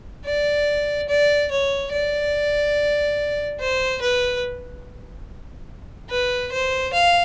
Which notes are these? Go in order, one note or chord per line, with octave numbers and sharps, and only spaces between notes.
D5
D5
C#5
D5
C5
B4
B4
C5
F5